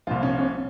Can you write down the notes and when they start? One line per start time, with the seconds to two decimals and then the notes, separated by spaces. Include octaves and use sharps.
0.07 C2 A#2 F3 F4
0.23 C#4
0.38 C#4